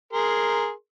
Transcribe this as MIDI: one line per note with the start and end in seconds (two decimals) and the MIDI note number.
0.13 0.71 68
0.13 0.71 70
0.13 0.71 84